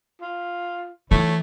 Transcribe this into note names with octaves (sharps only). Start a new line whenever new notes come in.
F4
E3 A3 C#5